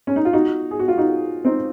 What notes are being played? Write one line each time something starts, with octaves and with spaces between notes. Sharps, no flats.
C#4
D#4
F4
D#4 F#4
G#4
F#4
F4
D#4 F#4
C4 D#4